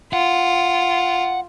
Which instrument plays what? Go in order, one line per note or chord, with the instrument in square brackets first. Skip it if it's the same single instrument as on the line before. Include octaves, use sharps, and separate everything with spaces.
[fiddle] F4 [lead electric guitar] F#5